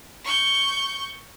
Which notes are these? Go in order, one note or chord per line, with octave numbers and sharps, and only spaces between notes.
C#6 G6